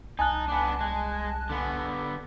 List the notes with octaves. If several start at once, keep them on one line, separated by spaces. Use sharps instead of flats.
C2 D#4 G#5 A5 F#6
B3 D4
G#3
D3 B3